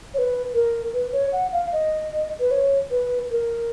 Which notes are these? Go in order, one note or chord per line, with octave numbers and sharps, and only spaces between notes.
C#5
B4
A#4
B4
C#5
F#5
F5
D#5
B4
C#5
B4
A#4